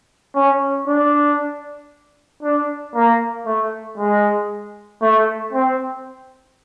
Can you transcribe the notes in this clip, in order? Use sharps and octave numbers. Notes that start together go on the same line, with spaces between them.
C#4
D4
D4
A#3
A3
G#3
A3
C4